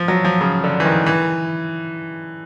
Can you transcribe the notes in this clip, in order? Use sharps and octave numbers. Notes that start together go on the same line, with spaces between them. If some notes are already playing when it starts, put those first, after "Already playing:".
Already playing: F3
F#3
F3
C#3
D3
E3
D#3
E3